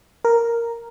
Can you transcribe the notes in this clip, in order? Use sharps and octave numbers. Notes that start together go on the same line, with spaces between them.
A#4